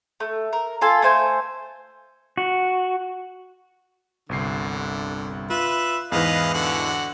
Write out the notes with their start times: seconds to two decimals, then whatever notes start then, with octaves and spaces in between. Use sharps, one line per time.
0.20 A3
0.53 A#4
0.81 F4 A4 G#5
1.02 A3 C5 G#5
2.37 F#4
4.29 G1 C2 D3 C7
5.50 F4 B4 E5
6.12 E2 G#2 E3 B4 D#5 F5
6.54 D3 F#4 F#5